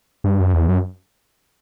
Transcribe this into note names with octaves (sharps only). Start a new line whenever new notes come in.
G2
F#2
E2
F#2